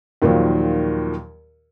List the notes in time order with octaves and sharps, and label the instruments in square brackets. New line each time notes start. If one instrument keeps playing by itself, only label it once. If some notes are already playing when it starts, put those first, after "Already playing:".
[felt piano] D#2 A#2 D#3 F3 F#3